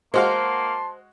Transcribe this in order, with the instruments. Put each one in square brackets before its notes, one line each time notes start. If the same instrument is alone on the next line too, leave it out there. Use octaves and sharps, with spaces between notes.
[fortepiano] G#3 F#4 F5 [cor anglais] A#3 [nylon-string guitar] C5 [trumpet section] A5 C6